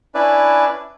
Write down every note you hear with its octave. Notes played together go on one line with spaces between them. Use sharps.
C#4 D4 E4 B4 D5